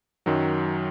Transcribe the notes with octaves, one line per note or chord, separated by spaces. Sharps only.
F#2 D#3 F#3